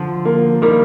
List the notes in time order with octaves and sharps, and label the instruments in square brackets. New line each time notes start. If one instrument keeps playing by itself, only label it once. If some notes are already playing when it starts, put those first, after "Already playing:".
Already playing: [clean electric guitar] D3 F3
[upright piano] A#3
[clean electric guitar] D#3 G3 [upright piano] A#3